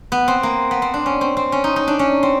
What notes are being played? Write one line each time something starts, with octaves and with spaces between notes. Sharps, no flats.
B3
C4
A#3
B3
C4
D4
C#4
C4
C4
C#4
D#4
D#4
D4
C#4
C4